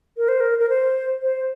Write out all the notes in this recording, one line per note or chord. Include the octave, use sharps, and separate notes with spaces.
A#4
C5
A#4
A#4
C5
C5